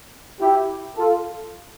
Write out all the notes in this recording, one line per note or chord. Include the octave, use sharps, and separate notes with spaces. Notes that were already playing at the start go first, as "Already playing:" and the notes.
E4 G4
F4 A4